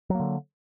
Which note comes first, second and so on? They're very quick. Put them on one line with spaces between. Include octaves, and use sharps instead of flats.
F#3 A#3 D3